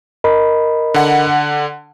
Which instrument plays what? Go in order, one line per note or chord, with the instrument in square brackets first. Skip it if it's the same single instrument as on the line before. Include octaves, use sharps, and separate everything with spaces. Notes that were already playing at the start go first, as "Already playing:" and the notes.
[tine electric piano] A#4 D#5 B5
[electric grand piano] D3 F#5